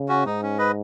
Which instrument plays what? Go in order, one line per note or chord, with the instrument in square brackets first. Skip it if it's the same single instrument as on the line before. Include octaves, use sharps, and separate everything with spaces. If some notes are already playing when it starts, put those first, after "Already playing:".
Already playing: [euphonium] C#3
[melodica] C#4 F#4
[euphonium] G#2 [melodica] D#4
[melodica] C#4
B4 D#5